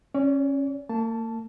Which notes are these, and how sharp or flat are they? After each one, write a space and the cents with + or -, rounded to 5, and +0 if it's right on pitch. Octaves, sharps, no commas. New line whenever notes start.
C#4 -15 D5 -45
A#3 -40 A5 +0